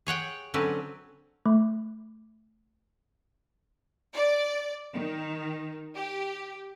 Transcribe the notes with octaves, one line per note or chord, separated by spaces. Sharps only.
G#4 C#5 F#5 G5
D3 F#3 C4 C#4 B4
A3
D5
D#3
G4